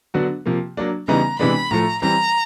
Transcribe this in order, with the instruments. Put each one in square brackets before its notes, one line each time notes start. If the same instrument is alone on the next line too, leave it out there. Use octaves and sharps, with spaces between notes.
[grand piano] D3 F#3 B3 D4 F#4
C3 F3 A#3
F#3 A#3 D4
[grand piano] C#3 E3 G3 B3 D#4 [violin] A#5
[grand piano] C3 E3 G#3 B3 D4 [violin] B5
[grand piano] A2 F3 A3 [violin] A#5
[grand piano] E3 G3 C4 [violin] A#5